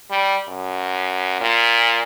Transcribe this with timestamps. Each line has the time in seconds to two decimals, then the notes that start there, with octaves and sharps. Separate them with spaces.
0.10 G3
0.48 F#2
1.41 A#2